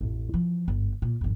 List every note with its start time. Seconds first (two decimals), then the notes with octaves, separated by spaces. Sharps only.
0.01 A1 F2
0.34 E3 F3
0.67 G1 G#2
1.02 A#2
1.21 G#1 F2